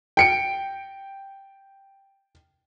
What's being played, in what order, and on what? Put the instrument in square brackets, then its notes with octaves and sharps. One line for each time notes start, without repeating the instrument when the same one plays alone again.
[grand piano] G5 C#7 D7